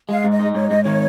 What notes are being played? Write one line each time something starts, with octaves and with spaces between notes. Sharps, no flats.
G#3 F5
G#2
D#5
D#4
G#2 C#5
G#2 D#5
D#3 C#5